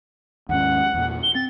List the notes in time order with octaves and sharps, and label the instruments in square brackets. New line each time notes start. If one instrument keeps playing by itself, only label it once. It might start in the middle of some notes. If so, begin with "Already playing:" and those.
[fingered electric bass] D#2 G#2 C#4 [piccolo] F#5
[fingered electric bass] E2 A#2
[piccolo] G7
[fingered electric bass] C4 [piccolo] A6